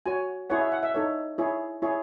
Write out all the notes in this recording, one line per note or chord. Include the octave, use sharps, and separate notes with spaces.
F#4 C#5 G#5
E4 G#4 C#5 F#5
E5
F#5
E5
D#4 A4 C#5
E4 G#4 C#5
E4 G#4 C#5